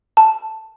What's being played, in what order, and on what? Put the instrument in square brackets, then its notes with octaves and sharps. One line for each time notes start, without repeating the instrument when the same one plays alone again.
[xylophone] A5